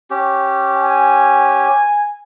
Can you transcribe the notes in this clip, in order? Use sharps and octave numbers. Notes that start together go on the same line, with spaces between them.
C#4 G4
G#5